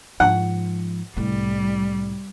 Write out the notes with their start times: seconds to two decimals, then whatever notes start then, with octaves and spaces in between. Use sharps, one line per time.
0.20 G#2 F3 F#5
1.17 C2 A2 G3